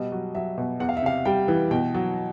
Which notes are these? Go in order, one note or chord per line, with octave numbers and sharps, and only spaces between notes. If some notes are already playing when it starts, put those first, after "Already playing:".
Already playing: B2 G3 D#5
F#3
F#3 E5
B2
E2 F#5
F5
E5
C3 F5
G3 G5
E3
B2 G5
F#3